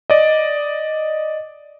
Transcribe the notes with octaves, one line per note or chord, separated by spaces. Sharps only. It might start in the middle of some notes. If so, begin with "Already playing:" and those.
D5 D#5